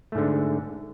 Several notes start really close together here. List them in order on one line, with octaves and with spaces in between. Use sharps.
A3 G#2 D3